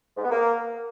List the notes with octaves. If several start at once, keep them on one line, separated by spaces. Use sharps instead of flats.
G#2
B3
A#3